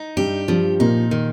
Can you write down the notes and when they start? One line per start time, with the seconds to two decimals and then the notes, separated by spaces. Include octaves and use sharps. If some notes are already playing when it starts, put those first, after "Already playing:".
Already playing: D#4
0.17 G2 G3 G4
0.48 G2 F3 G3
0.80 A#2 A#3 D#4
1.11 D#3